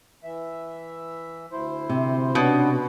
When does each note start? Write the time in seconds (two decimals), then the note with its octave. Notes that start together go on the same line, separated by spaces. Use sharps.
0.24 E3 E5
1.52 D2 E4 C5
1.89 C3
2.35 B2 B3 C#4 D4